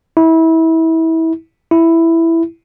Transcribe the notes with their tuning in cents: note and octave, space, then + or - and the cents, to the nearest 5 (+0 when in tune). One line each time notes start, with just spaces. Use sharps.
E4 -25
E4 +5